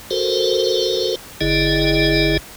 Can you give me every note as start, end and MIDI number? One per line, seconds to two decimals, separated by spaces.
0.11 1.15 66
0.11 1.15 69
0.11 1.15 70
0.11 1.15 72
1.41 2.37 31
1.41 2.37 50
1.41 2.37 64
1.41 2.37 68
1.41 2.37 75